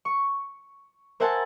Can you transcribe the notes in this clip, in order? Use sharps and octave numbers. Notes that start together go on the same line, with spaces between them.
C#6
A#4 C5 E5 F#5 G#5 A5